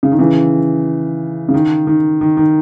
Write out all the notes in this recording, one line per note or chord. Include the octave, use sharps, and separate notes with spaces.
C#3
D#3
C#3 E3
C#3
D#3
D#3
D#3
D#3